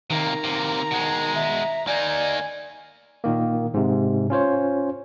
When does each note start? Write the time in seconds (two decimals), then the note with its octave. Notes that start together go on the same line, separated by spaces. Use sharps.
0.10 C3 D#3 A#3 A#5
0.44 C3 A#3
0.91 B2 G#3
1.35 E5
1.87 A#3 D#4 D5 G#5
3.24 A#2 D#3 A#3
3.74 G#2 C3
4.30 C#4 F4 C5 C#5